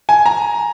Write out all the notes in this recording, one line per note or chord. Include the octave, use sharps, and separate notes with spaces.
G#5
A#5